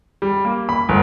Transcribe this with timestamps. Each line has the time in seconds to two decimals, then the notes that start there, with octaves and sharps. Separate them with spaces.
0.22 G3
0.45 A#3
0.69 B5
0.89 G1